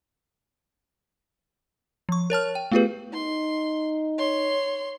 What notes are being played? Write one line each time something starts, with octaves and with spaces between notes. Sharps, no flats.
F3 C#6
A#4 C#5 A5 F6
G5
A3 B3 F4 G4 G#4 B4
D#4 C6
C#5 C6